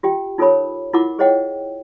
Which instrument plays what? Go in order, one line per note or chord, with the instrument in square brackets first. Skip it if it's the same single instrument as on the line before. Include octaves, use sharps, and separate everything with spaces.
[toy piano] F4 G4 G5
D#4 F4 A4 A#4 C#5 B5
E4 F4 A#4 F#5 D6
G#4 C5 C#5 D#5 F#5 G5